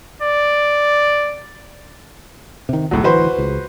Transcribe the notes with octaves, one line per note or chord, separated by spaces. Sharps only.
D5
C3 D#3
D1 G#1 C#2 A2 F#3
D2 D#3 E3 F#4 B4 C5
C#2